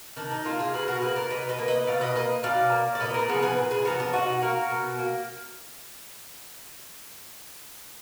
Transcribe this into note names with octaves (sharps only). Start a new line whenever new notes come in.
D#3 D4
D#4
A#3 D4 F4
F4 G#4
B2 G#4 B4
F#4 A#4
A#3 G#4 B4
A#4 D5
B2 B4 D#5
B4 D#5
A#3
B4 D#5
B2 D5 F5
B4 D#5
A#3 B4 D#5
B2 D5 F5
A#3
D5
A#2 B4 D#5
A#4 D5
F3 B3 G#4 B4
G#4 B4
A#2
G#4 B4
F3 B3 F#4 A#4
D4
B2 D#4 F#4
A#3 F#4 A#4
B2
A#3